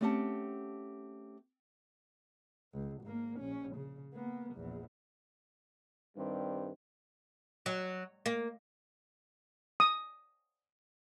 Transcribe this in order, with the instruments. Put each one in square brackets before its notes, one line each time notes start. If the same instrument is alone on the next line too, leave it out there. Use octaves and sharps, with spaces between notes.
[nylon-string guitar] A3 C4 C#4 G4 F#5 A5
[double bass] C#2
G#1 A#3
A#1 C#4
C#3
A#3 B3
A#1 E2
[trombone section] G2 D#3 G3 C4
[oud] F#3
A#3
[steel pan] D#6